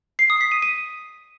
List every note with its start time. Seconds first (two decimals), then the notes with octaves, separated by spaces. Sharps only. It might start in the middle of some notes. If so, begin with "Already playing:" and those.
0.19 C7
0.30 D#6
0.41 B6
0.52 D#7
0.62 D#7